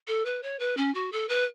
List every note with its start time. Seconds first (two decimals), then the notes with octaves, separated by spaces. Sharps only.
0.07 A4
0.25 B4
0.43 C#5
0.59 B4
0.77 C#4
0.94 F#4
1.12 A4
1.29 B4